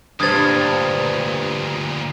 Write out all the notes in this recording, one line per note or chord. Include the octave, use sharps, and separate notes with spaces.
D2 G2 A#2 C5 D#6 G#6 A6